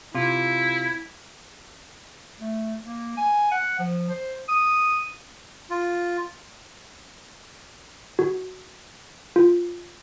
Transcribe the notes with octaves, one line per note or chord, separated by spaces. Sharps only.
C3 E4 F4
A3
A#3
G#5
F#5
F3
C5
D#6
F4
F#4
F4